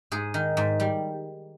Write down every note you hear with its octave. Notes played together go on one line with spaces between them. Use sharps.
G#2 G#4
D#3
G#2
G3